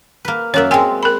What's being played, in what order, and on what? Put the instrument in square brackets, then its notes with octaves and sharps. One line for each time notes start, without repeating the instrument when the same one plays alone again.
[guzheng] A#3 B4
[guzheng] F#2 A#3 E5 [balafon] A#4 C#5
[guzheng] G#3 C4 [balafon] G5 G#5
[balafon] A#4 B5